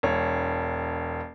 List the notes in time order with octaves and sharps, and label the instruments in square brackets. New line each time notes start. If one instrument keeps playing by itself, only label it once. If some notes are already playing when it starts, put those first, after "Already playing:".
[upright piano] E1 C#5